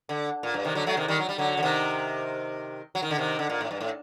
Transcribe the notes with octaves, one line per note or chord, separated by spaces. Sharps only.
D3
A#2
G2
C3 D#3
D3 F#3
F#3 A3
C3 D#3
D#3 G3
F#3
G3
D3 F#3
D3
C3 D#3
F#3
D#3
D3
C3 D#3
D3
A#2
A2
G2
A2